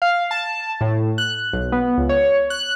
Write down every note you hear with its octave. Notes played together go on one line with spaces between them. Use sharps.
F5
A5
A2
F#6
B1
B3
C#2
C#5
F#6